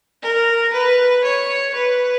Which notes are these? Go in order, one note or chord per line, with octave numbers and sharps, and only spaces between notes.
A#4
B4
C#5
B4